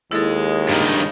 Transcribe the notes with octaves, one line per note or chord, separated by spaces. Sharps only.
D#2 G#3 E4 A4
G2 D#3